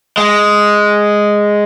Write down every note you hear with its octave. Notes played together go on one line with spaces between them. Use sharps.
G#3